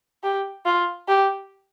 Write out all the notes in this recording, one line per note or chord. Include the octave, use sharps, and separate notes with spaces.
G4
F4
G4